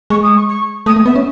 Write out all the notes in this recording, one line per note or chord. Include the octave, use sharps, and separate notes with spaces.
G#3 C#6
D#6
C#6
C#6
A3 D#6
A3
B3 E5
C#4